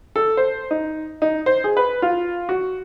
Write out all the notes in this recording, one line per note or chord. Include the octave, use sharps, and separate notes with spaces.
A4
C5
D#4
D#4
C5
G#4
B4
F4
F#4